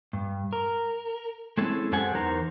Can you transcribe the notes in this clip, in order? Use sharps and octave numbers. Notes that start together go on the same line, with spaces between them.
G2
A#4
G#3 C4 C#4 E4 G#4 A4
F#2 G4 A4 C5 F#5 G#5
E2 B3 D#4 A#4 C5 A#5